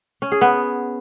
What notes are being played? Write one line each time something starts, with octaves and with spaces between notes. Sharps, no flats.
C#4
G#4
B3